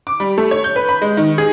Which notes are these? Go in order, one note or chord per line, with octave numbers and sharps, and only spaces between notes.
D6
G3
A3
C#5
G6
B4
B5
G#3
D#3
G#4